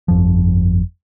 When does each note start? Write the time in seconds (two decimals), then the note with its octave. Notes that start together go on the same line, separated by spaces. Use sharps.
0.08 G1 F2 F3